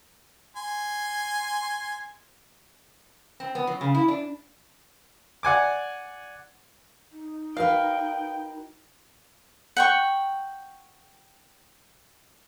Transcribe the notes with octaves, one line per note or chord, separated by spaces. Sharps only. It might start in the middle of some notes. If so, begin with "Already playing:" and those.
G#5 C6
C4
B3
F#3
C#3
E4
D4
D5 F#5 G#5 D6
D#4
F#4 A#4 B4 F5 G5
F#5 G5 C#6